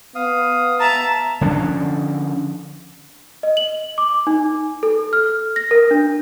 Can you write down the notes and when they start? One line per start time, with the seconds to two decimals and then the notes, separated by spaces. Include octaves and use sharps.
0.15 B3 F5 D#6
0.80 E5 A5 A#5
1.41 D3 F3 C#4 D4
3.43 D#5
3.57 F#7
3.98 D6
4.27 D#4
4.83 A4
5.13 F6
5.56 A#6
5.71 A#4
5.91 D4